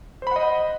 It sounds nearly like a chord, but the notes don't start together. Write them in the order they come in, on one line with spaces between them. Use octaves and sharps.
C5 B5 F#5 D#5